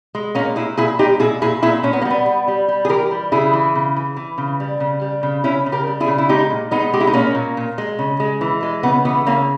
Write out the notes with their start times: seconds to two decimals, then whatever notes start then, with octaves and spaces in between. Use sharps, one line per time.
0.15 G#3
0.35 A#2 A#3 C#4
0.56 A#2 E4 G#4
0.77 A#2 E4 G#4
0.99 G#3 D#4 G4
1.19 A#2 E4 G#4
1.42 A#2 E4 G#4
1.63 A#2 E4 G#4
1.83 A#2 C#4
1.93 B3
2.02 A#3
2.05 G3
2.11 B3
2.26 G3
2.48 G3
2.68 G3
2.85 G#4
2.89 E3 G4 A#4
3.11 G3
3.32 C#3 E4 G#4
3.53 E3
3.75 C#3
3.96 E3
4.16 E3
4.38 C#3
4.60 G3
4.80 C#3
5.02 G3
5.23 C#3
5.44 C#3 C#4 E4
5.66 C#3
5.72 G4 A#4
5.87 G3
6.00 E4 G#4
6.08 C#3
6.18 E4
6.29 G#3 D#4 G4
6.50 A#2
6.71 G#3 B3 D#4
6.93 G#3 G4
7.01 E4
7.07 D#4
7.13 A#2 A#3 C#4
7.35 A#2
7.57 A#2
7.78 G#3
7.99 C#3
8.20 G#3
8.41 E3
8.63 G#3
8.83 C#3 B3
9.05 E3 B3
9.26 C#3 A#3